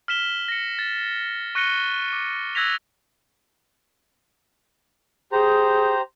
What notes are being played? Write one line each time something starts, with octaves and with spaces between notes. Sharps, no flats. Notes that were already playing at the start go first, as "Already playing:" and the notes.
F6 B6 E7 G7
A#6 C#7
A6
C#6 F#6 A#6 C#7 D#7 G7
D6
E6 F#6 G#6 A#6 B6 F7
G4 G#4 C5 A#5